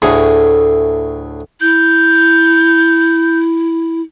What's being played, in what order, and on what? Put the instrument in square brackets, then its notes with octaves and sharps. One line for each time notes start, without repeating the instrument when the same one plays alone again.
[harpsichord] D2 A2 G#4 C#6
[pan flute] E4 [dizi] G6